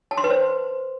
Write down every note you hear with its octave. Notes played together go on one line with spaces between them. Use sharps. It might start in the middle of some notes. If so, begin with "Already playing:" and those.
A5
C6
B4
C5